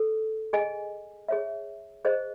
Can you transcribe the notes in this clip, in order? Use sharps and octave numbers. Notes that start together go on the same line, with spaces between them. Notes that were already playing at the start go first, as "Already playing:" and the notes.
Already playing: A4
G#4 D#5 G#5
G#4 C#5 E5
G#4 C5 D#5